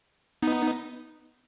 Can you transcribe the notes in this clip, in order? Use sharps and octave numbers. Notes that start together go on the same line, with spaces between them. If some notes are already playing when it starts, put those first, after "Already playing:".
B3 D#4